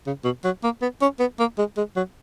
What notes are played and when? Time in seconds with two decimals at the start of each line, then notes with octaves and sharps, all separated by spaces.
0.06 C#3
0.24 B2
0.44 F#3
0.64 A#3
0.82 B3
1.02 C#4
1.20 B3
1.39 A#3
1.58 G#3
1.77 G#3
1.96 F#3